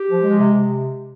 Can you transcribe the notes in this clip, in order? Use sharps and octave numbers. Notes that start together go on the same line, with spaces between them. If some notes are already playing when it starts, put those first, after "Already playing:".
Already playing: G4
F3
G#3
C3
C3